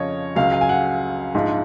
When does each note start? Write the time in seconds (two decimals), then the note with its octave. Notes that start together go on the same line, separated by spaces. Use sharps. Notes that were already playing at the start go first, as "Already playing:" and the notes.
Already playing: F2 C#3 F3 C#5 D#5
0.36 C#2 C#3 F#3 F5
0.52 F5
0.61 G#5
0.69 F#5
1.35 A#1 G#2 F3